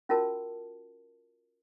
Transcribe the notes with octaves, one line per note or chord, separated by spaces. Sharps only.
C#4 F4 F#4 A#4 A5